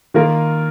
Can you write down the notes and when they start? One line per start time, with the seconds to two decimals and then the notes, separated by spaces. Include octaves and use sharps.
0.14 D#3 A#3 F4 A#4